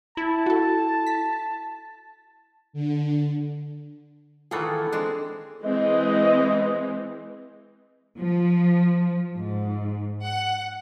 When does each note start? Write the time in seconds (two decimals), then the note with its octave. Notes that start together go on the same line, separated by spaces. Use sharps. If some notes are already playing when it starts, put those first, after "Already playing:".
0.17 E4 A5
0.46 F#4 A4
1.07 B6
2.73 D3
4.51 D#3 E3 F4 G#4 A4 F#5
4.92 G#3 C4 D4
5.65 E3 G#3 C4 D#5
8.18 F3
9.37 G#2
10.24 F#5